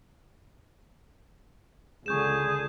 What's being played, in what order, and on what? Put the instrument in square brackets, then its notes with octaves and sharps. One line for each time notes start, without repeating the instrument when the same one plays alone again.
[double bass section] C#2 D3 [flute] G#4 [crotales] C#6 G6 E7